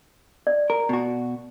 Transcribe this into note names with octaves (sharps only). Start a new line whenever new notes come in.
D5
A#4
B2 F#4